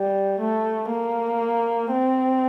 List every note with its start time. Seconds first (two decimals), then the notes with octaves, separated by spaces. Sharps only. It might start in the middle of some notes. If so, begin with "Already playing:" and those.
Already playing: G3
0.40 A3
0.91 A#3
1.93 C4